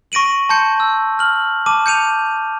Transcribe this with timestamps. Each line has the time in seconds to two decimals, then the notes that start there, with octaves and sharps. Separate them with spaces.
0.12 C#6 A#6 D7 D#7 F#7
0.49 A5 C6 G6 C#7
0.80 E6
1.19 F6 F#7
1.66 A5 D6 D#7
1.86 G6 C#7 D#7 F7